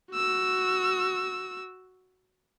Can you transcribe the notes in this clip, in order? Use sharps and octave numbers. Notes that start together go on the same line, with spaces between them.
F#4 E6